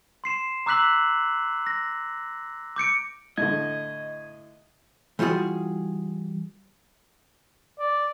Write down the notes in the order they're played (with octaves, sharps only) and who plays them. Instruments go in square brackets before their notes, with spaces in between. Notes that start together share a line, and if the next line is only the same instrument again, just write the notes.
[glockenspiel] C6 C7 E7
A#5 D6 E6 F#6 B6 F#7
A#6
D6 G6 C#7 D7
[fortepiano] A2 D3 [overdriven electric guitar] D#5 [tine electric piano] G#6
[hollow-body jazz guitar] E3 G3 F4 F#4 G#4
[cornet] D5